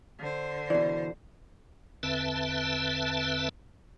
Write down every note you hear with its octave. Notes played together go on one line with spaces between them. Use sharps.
D3 C5
B2 E3 D5
E2 D3 C4 B4 E5 A5